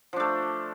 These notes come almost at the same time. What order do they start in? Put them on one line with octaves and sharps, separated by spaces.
F3 D4 A3